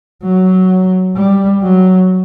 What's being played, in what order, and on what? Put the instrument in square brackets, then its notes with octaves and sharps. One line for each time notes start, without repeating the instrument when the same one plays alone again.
[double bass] F#3
G3
F#3